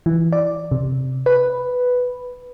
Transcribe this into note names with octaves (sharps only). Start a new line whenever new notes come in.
E3
D5
C3
B4